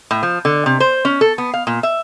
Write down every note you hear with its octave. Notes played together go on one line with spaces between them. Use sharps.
A2
F3
D3
C3
C5
C#4
A4
B3
F5
A#2
E5